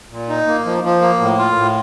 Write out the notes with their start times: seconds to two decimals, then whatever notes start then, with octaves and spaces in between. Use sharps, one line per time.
0.11 A#2
0.29 D#4
0.47 A#3
0.66 F3
0.84 F3
1.01 A#3
1.20 A2
1.38 F4
1.56 A2